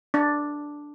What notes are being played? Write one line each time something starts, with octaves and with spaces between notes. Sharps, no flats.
D4